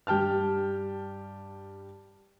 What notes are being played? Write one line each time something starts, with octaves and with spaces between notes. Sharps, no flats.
G2 G4 G5 A5 F6